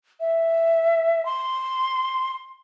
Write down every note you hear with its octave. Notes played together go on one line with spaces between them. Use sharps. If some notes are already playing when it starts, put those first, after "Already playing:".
E5
C6